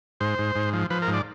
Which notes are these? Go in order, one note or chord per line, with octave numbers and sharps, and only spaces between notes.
G#2 C5
G#2
G#2
F3
F3 B4
A#4
G#2
D5